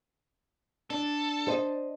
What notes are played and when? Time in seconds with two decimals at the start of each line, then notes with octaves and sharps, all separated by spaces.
0.90 D4 A4
1.48 C5 D#5